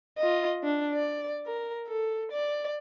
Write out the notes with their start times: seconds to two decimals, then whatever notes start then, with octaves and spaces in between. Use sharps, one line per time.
0.18 F4 D#5
0.63 D4
0.94 D5
1.46 A#4
1.87 A4
2.32 D5